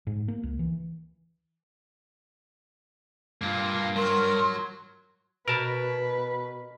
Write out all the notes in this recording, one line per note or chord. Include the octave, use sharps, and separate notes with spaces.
G#2
A#3
C#2
E3
G2 A#3 F4
F#3 A#4 C6
B2 A#4 B4 A5